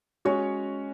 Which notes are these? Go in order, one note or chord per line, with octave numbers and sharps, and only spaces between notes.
G#3 C#4 F#4 C#5